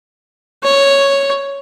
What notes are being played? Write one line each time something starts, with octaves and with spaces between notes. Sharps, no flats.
C#5